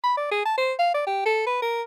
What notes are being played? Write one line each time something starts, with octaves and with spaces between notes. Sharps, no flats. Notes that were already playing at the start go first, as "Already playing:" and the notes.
B5
D5
G#4
A5
C5
F5
D5
G4
A4
B4
A#4